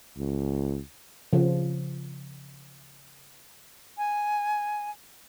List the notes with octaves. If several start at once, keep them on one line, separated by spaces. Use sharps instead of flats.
C#2
C#3 F3
G#5